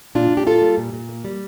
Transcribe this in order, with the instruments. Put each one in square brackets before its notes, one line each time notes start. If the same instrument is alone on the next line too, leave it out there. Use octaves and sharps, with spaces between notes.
[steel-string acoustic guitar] A#2 D4 F4
A#2
G4
A#3 F4 A4
G3
A#2
A#2
A#3
G3